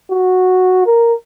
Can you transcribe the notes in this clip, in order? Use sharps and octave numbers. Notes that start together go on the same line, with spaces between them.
F#4
A#4